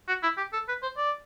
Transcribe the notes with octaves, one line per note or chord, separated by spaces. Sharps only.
F#4
E4
G4
A4
B4
C5
D5